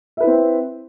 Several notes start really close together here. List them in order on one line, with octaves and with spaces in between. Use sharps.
E5 B4 E4 C4